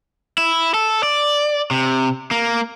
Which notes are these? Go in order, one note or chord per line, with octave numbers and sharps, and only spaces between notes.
E4
A4
D5
C3
A#3